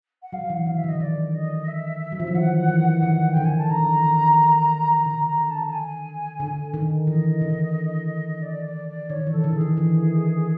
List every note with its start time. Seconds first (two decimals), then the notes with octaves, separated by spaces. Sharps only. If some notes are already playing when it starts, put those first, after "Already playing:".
0.22 F#5
0.32 F#3 F5
0.50 E3 F#5
0.65 D#3 F5
0.77 E5
0.84 D3
0.89 D#5
1.00 D#3 D5
1.35 D#5
1.68 E5
2.12 F#3
2.20 F3
2.27 E3
2.35 D#3 F#5
2.68 E3
3.02 D#3
3.32 D3 G5
3.45 G#5
3.58 A5
3.70 D#3 A#5
4.04 D#3
5.05 D3 A#5
5.27 A#5
5.51 A5
5.66 A5
5.72 G#5
6.40 D3
6.74 D#3
7.07 E3 D#5
7.42 D3
8.42 D5
8.65 D5
8.87 D5
9.10 D#3 C#5
9.27 E3
9.32 A4
9.44 D3
9.55 G#4
9.61 D#3
9.77 E3